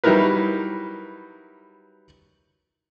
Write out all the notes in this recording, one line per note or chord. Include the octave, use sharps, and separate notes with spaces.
F#3 G3 D#4 E4 A#4 B4